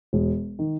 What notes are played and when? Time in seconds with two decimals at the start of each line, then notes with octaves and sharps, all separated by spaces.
0.13 E1
0.59 D#3